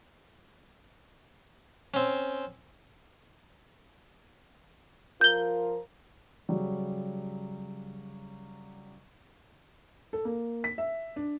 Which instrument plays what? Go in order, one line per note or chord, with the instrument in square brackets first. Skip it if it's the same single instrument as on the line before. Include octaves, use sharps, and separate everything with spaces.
[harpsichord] C4 C#4
[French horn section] F3 F4 A#4 [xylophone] G6 G7
[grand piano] C#3 F#3 G3
[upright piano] A4
A#3
B6
E5
D4